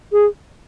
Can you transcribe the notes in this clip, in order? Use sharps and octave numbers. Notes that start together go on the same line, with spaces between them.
G#4